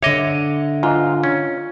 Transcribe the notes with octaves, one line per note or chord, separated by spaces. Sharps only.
D3 C#5 D#5 E5 D6
G#2 F4
C#4